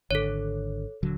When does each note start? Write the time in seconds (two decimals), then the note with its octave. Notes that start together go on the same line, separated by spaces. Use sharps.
0.11 G#1 D3 A4 C#5
1.03 D#1 D3 F#3